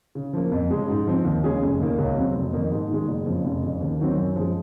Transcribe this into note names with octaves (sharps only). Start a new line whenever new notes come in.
C#3
F3 A#3
F2
C#3 G#3
G#2
F3 C4
D#2
C#3 G#3 C#4 G#4
F1
D#2 D#3 A#3
C#2
C3 F#3 C4
F1
F2 D#3 A#3 D#4
G#2
D#3 G#3
F#1
F2 C#3 F3
F1
F2 C#3
D#2
D#3 F#3 C4
F#2
F3 G#3